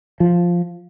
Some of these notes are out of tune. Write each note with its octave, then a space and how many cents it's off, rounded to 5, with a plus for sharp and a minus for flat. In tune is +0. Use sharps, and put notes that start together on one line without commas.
F3 +0